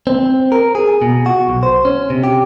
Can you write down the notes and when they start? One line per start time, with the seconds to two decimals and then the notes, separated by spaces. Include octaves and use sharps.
0.07 C4
0.52 A#4
0.75 G#4
1.02 B2
1.26 F#4
1.49 B1
1.63 C5
1.85 C#4
2.10 C3
2.24 G4